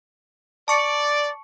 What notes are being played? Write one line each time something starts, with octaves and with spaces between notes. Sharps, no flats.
D5 A5 C#6 C#7